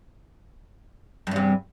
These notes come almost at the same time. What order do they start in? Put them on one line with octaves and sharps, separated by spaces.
G2 E2 C3